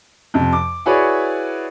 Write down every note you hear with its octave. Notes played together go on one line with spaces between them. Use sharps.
F2 C3
D6
E4 F#4 G#4 B4 C#5 D5